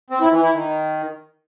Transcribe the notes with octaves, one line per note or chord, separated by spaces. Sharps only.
C4
E4
E3
E4
D#3